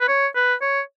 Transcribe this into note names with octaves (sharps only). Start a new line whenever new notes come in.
B4
C#5
B4
C#5